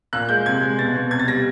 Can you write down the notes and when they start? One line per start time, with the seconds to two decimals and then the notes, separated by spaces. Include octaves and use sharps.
0.13 A#2 F#6
0.29 G#3 G6
0.46 C3 G#6
0.62 G#3
0.78 B2 A6
0.95 B2
1.11 C3 G#6
1.19 A6
1.28 G3 A#6